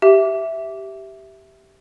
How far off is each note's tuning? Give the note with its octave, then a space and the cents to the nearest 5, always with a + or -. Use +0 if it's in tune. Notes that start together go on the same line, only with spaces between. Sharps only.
G4 -10 E5 +0